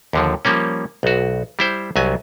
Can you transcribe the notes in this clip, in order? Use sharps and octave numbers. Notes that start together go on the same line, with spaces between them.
D#2 D3 F3
F3 G3 A#3 C#4
B1 F#4
G3 E4 C5
C2 F#3 G#5